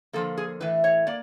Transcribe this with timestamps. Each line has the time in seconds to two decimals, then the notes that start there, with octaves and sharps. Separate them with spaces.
0.13 D3 F3 A#3 A4
0.38 G#4
0.60 A2 E3 A3 B4
0.84 C#5
1.07 A#3 D5